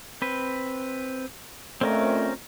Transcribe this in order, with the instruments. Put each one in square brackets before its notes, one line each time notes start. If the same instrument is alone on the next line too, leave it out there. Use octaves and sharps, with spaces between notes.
[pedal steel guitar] C4 B4
[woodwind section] F2 A#2 A3 [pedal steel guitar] C4 C#4 A#4